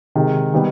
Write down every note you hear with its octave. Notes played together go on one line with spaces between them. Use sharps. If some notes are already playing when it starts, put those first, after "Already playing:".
C3 D#3 G#3
D#3 G3 B3